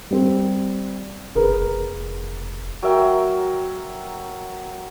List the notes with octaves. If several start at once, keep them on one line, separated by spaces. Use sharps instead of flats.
G3 C4
F#1 G#4 A#4 B4
F1
F#3 A#4 E5 G5